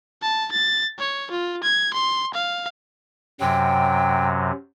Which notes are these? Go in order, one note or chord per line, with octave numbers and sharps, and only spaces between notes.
A5
A6
C#5
F4
G#6
C6
F5
F#2 C3 F#3 G5